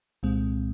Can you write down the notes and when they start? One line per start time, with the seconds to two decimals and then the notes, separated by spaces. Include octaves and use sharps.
0.23 C2 A#2 G#3 C4